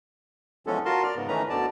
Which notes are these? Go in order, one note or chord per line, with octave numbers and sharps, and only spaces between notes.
E3 F3 G#3 B3 C#4 A4
F4 F#4 A#4 A5 C6
D5 F6
G#2 C#3 B3
D#3 E3 A3 C#4 B4 A#5
D2 B2 D3 D5 A5